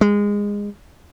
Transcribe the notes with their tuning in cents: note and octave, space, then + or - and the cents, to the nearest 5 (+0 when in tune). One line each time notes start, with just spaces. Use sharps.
G#3 -20